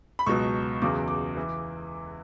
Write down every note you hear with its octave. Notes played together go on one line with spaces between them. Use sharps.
B5
C#2 B2 F#3 C#6
E2 C#3 F#3 D6
D6
E3